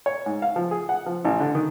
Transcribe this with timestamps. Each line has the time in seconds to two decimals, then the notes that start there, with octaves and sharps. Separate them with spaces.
0.06 C#5
0.26 G#2
0.42 F5
0.56 F3
0.71 G#4
0.89 F#5
1.06 F3
1.25 A1
1.40 D3
1.55 D#3